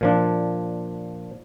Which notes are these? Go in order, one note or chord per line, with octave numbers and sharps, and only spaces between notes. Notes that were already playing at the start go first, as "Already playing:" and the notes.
A#2 F3 D4